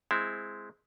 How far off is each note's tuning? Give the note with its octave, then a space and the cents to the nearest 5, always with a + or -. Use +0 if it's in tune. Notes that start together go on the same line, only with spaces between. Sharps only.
G#3 +0 C4 -10 E4 +0